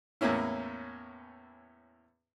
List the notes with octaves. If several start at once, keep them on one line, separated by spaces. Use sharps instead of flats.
E2 A2 A#3 C#4 E4